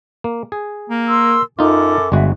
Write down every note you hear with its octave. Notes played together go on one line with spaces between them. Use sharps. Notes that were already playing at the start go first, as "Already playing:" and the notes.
A#3
G#4
A#3
A#4 C6 E6
F#2 D#4 F4 A4 D6
G1 G#3 F#4 E5